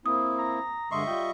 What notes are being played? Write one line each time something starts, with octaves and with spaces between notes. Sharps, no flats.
A#3 C4 E4 D#6
A#5
G2 D3 G#3 D#5 E5 C6 C#6
G3 F4 G5